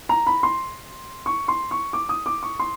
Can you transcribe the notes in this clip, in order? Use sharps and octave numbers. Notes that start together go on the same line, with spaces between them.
A#5
B5
C6
C#6
C6
C#6
D6
D#6
D6
C#6
C6